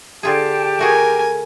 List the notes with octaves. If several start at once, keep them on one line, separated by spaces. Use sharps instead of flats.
D3 F4 G4 G#4 G5 A5
A3 F#4 G#4 A#4 G#5